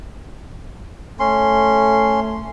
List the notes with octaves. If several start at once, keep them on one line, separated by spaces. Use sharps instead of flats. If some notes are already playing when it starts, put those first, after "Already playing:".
A3 C#4 C6